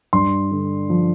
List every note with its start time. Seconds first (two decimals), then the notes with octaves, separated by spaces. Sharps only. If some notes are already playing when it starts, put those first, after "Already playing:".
0.13 G2 C6
0.51 D3
0.90 F3